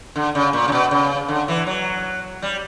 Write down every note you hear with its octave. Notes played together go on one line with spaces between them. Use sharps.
D3
C#3
A#2
C#3
B2
C#3
D3
E3
F#3
G3